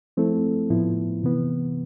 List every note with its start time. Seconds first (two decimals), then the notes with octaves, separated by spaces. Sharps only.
0.17 F3 A3 C4 E4 A4
0.70 A2 F3 B3 E4
1.23 C3 E3 B3